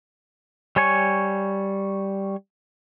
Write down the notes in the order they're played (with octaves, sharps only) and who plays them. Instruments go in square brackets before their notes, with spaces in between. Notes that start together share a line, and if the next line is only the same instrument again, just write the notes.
[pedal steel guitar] G3 C#5 G#5 C#6